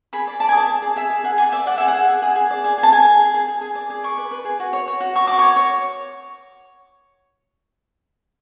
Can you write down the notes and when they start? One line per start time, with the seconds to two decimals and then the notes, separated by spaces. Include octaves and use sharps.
0.13 G#4 B5
0.27 D5
0.40 D5 A5
0.49 G#5
0.54 G#4 A5
0.68 D5
0.82 G#4
0.96 G#4 E5
1.10 G#4
1.24 G#4 F#5
1.38 D5 G#5
1.52 D5 E5
1.66 D5 F#5
1.78 G#4 E5
1.88 F#5
1.94 G#4
2.09 G#4
2.22 G#4
2.36 G#4
2.51 D5
2.64 G#4
2.78 G#4
2.83 A5
2.92 G#4 G#5
3.06 G#4
3.19 G#4
3.34 G#4
3.48 G#4
3.61 G#4
3.75 D5
3.90 G#4
4.03 D5 C#6
4.18 B4
4.31 B4
4.45 G#4
4.60 F#4
4.73 C#5
4.88 C#5
5.00 F#4
5.15 F#4 C#6
5.27 F#4 D6
5.39 C#5 C#6
5.56 C#5